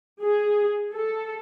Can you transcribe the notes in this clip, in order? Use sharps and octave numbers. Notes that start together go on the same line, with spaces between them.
G#4
A4